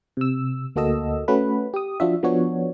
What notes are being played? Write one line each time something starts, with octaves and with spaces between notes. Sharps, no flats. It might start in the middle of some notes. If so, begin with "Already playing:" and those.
C3 E6
D2 A#3 F#4 A4 D#5 E6
A3 C#4 F#4 B4 B5
G4 D#6
F3 D4 F4 F#4 E5
F3 B3 D4 F#4 C#5